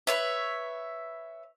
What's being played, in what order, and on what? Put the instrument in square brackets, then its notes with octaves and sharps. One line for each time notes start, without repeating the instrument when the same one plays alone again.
[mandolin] B4 C#5 E5